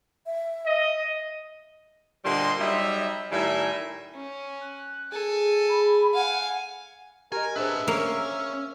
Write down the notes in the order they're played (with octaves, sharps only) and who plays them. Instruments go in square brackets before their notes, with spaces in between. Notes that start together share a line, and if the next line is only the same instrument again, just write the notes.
[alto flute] E5
[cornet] D#5
[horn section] A#2 D3 G3 C5 D#5 C6
F#3 G3 D#4 E5
A2 D#3 G3 A#4 E5 G#5
[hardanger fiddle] C#4
[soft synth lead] F#6
[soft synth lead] G#4 [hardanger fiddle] A4 G#5
[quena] B5
[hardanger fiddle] F5 G#5 [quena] F#5
[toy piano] G4 D#5 [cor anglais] A#4 [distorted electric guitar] G#5
[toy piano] D4 G#4 C5 [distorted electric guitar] B4 A5 [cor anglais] E5
[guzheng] A#3 [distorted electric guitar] C#4